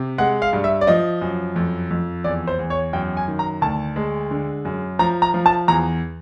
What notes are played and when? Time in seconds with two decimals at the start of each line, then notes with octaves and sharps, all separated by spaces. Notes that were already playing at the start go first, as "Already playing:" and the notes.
Already playing: C3
0.18 G#3 F#5
0.42 F5
0.53 G2
0.64 E5
0.81 D5
0.87 F3 D#5
1.22 F#2
1.56 F2
1.91 F2
2.24 E2 D5
2.47 C5
2.59 E2
2.70 C#5
2.93 F#2 G5
3.17 G#5
3.28 D#3
3.39 A#5
3.62 D2 A5
3.96 G#3
4.31 D3
4.65 F#2
4.99 F3 A#5
5.22 A#5
5.34 F3
5.46 A5
5.68 E2 A#5